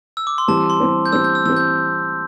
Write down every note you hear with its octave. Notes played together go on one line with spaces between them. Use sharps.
E6
D6
C6
E3 G3 C4 A5
C6
E3 G3 C4
G6
E3 G3 C4 E6
G6
E6
E3 G3 C4 E6
G6